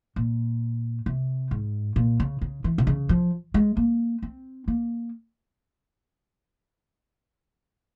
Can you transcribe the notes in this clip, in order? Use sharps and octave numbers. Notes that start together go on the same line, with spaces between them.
A#2
C3
G#2
A#2
C#3
C#3
E3
C3
C#3
F3
G#3
A#3
C4
A#3